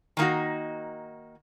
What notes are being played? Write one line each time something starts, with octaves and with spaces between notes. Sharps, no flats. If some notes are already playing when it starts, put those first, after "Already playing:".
D#3 A#3 D#4 F#4